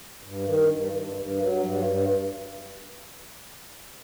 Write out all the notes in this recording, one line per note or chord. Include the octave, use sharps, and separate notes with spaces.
G2
D#3
G2
G2
G2
F#3
G2
G2